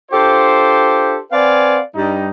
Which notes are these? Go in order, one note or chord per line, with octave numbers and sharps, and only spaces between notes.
D4 F4 G4 A4 C5
C4 B4 D5 F5 F#5 G#5
G2 G3 D#4